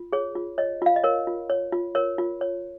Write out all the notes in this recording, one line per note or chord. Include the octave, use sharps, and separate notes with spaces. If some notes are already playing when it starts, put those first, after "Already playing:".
Already playing: F4
G#4 C#5
F4
C#5 D#5
F4 F5
D#5
A#4 C#5
F4
C#5
F4
A#4 C#5
F4
C#5